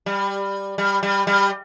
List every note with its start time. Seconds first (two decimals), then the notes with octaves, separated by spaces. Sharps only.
0.06 G3
0.78 G3
1.03 G3
1.27 G3